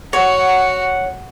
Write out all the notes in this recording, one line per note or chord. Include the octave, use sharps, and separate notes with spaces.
F#4 C#5 F#5